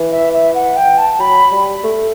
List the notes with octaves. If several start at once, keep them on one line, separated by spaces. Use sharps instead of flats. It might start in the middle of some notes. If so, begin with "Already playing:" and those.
Already playing: E3
E5
E5
F#5
G5
A5
F#3 B5
G3
A3